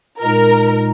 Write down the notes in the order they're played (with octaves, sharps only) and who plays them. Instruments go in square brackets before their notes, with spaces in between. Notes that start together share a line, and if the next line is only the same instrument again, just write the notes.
[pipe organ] A#2 G#3 D#4 [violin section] A#4